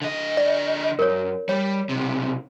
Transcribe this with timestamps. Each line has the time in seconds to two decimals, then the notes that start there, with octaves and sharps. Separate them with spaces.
0.02 D3 D#5
0.37 D5
0.99 F#2 A#4 C#5
1.49 G3 C#5
1.89 B1 C3